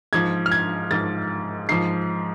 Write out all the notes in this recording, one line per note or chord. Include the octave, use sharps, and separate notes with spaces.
G#2 F3 G#6
F6
G#6
G#2 F3 A6
G#2 F3 C7